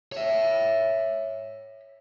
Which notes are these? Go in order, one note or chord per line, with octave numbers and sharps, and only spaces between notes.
C#5 E5